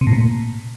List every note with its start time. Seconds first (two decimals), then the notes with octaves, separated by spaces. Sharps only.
0.01 C3
0.07 A2
0.13 A#2